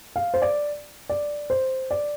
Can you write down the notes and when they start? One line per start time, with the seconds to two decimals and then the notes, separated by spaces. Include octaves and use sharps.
0.16 F5
0.34 C5
0.42 D5
1.09 D5
1.50 C5
1.91 D5